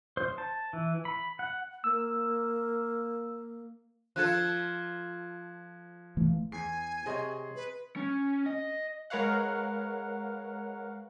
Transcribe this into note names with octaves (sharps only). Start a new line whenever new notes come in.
C5
A5
E3
B5
F#5
A#3 E6
F3 F4 A4 F#6 G#6
E3 A3
E2 G#5 C7
C3 G#4 C#5 D#5 C6
B4
C#4
D#5
G#3 A#4 B4 C#5 F5 F#5